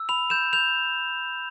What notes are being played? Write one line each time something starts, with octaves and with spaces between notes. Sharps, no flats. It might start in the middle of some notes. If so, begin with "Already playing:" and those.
Already playing: E6
B5 F7
G6 E7
G6 F7